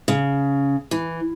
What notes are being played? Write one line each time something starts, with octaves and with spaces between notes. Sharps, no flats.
C#3
E3